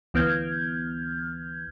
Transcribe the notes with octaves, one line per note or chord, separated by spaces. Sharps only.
D2 E3 B3 F6 G6 G#6